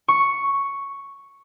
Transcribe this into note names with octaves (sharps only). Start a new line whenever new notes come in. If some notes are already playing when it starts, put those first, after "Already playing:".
C#6